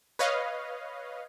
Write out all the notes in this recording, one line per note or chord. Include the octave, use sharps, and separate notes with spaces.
B4 C#5 D#5 F5